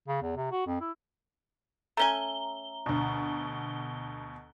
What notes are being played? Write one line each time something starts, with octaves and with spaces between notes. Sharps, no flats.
C#3
E2
C3
F#4
F2
E4
A3 C#4 G#5 A#5 G7
D2 B2